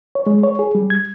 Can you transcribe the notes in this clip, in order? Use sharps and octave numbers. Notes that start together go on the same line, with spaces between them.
C#5
G#3
C#5
G#4
G3
G#6